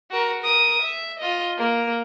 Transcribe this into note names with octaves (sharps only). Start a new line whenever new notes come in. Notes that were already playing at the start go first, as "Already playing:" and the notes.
F#4 A#4
A#4 D#6
E5
F4 D#5
A#3